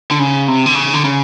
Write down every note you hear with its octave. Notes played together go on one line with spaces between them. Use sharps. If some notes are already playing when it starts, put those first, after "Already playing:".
D3
C#3
C3
D3
C#3
D3
C#3